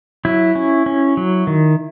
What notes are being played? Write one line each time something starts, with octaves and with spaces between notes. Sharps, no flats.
F#3 E4
C#4
C#4
F#3
D#3